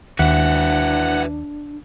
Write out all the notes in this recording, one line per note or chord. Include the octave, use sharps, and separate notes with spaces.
D#2 D4 F#4 B4 E5 F#5